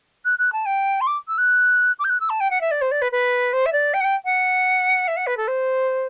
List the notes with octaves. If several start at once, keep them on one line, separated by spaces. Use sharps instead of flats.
F#6
F#6
A5
G5
C6
D6
E6
F#6
D6
G6
F#6
E6
A5
G5
F#5
E5
D5
C5
D5
B4
B4
C5
E5
D5
G5
F#5
G5
F#5
E5
F#5
B4
A4
C5